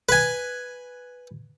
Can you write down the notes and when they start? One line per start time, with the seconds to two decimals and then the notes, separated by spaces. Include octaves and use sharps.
0.09 B4 G#5